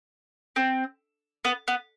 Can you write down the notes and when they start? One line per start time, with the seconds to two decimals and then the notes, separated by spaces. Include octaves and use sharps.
0.56 C4
1.45 B3
1.68 B3